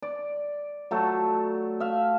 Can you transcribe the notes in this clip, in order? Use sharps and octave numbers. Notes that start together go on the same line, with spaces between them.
D5
F#3 A3 A4
E5 F5